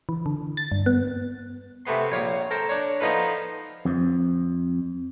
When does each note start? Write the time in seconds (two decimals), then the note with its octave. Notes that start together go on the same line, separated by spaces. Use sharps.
0.09 E3
0.26 D3
0.57 A6
0.72 G2
0.86 B3
1.86 C3 A3 B3 C6
2.12 A#1 C#5 F5 D6 D#6
2.51 A4 A#4 C5 G5
2.69 D4 C#5
3.00 F3 B3 D#4 F4 A4 B4
3.85 F2